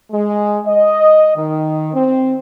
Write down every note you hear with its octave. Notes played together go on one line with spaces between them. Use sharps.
G#3
D#5
D#3
C4